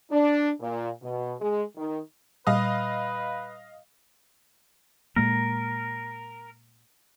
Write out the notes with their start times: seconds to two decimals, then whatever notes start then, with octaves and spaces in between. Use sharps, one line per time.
0.11 D4
0.61 A#2
1.02 B2
1.40 G#3
1.76 D#3
2.47 A#2 G3 B4 D#5 F5 D#6
5.16 A#2 G#3 A#3 A#4